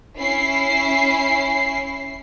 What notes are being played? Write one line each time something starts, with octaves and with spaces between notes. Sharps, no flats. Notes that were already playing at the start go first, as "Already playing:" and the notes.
C#4 E4 C7